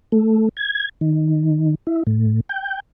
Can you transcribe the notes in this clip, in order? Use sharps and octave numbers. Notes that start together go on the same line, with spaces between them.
A3
G#6
D#3
E4
A2
G5